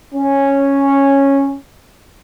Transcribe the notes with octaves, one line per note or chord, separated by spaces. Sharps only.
C#4